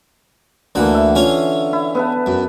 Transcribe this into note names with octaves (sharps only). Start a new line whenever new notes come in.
D2 D3 E3 A#3 F#5
E5
C#4 F4 C#5
E4
B3 B4 A5
F#2